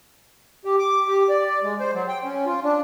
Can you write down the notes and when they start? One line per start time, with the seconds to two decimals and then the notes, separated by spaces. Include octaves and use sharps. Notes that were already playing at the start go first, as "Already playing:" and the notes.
0.65 G4
0.79 D6
1.08 G4
1.29 D5
1.63 G#3
1.80 C5
1.94 F#3
2.08 G5
2.24 C#4
2.46 F4
2.63 D4